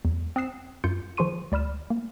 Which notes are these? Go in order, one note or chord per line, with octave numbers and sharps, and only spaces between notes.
E2
C4 D#6 F#6 C7 E7
F#2 F4 G6 C#7
D#3 F3 G#4 C6 C#6 D#7
D2 D5 B5 F6 E7
A#3